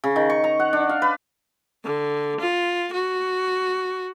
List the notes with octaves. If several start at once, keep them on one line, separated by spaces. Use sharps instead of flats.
C#3
D#3
C#6
A#5
F#5
D4
F5
B4
D3
F4
F#4